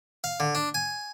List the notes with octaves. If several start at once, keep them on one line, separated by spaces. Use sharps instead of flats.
F5
D3
D4
G#5